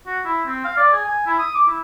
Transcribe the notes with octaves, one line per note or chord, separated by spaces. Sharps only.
F#4
E4
C4
F5
D5
G#4
G#5
E4
D#6
D6
E4